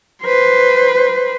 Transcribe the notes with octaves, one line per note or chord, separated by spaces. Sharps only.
B4 C5